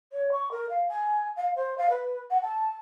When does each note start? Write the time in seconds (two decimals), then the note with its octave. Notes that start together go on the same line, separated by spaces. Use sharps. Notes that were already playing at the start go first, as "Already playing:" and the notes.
0.12 C#5
0.31 C#6
0.51 A#4
0.69 F5
0.89 G#5
1.36 F5
1.56 C5
1.77 F5
1.89 B4
2.30 F#5
2.42 A5